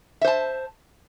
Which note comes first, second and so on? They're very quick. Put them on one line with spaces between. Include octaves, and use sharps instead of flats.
E5 C5 A5